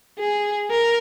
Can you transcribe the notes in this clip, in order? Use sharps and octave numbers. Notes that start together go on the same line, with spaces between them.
G#4
A#4